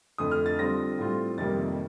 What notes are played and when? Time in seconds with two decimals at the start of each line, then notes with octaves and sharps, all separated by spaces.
0.18 F2 D3 A3 D#6
0.31 F6
0.46 A6
0.59 D3 G3 C4 F4 A#6
0.98 A2 G3 C4 F4
1.38 F2 C3 D#3 G3 A#3 A6